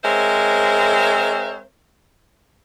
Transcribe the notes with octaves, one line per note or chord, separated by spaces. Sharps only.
G#3 C4 A#4 C5 C#5 E5